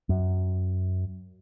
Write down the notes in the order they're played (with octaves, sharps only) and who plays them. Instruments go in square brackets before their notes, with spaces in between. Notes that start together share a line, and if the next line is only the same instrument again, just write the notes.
[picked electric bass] F#2